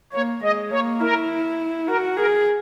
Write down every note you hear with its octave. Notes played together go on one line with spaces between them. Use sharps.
A#3 C#5
G#3 D#5
A#3 C#5
E4 A#4
F#4 A#4
G#4 A#4